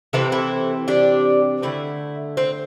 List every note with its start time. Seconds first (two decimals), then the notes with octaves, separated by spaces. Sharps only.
0.13 C3 E3 C4 E4 A4
0.32 E4 A4
0.88 D4 G4
1.62 D3 A3 C4 E4
2.37 C4